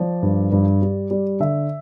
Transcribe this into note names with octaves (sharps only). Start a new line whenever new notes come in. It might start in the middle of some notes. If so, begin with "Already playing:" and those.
Already playing: F3 D5
G2
G2
G3
G3
D3 E5